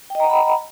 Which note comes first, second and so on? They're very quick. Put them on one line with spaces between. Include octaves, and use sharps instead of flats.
G5 D#5 A#5 F#5 B5